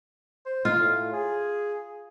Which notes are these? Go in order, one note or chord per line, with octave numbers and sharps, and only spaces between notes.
C5
D#4 F4
A2
G#4